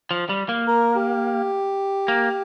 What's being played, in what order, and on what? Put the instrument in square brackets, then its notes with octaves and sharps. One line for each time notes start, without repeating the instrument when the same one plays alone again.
[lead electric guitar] F3
G3
A#3
[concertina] A#4
G4
[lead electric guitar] A#3